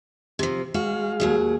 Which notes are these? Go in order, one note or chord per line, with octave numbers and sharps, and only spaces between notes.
C3 F3
G#3 F#4 F5
D#2 F#3 G#4